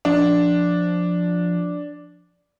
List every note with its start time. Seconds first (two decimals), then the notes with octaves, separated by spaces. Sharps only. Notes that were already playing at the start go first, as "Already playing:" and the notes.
0.05 F3 D4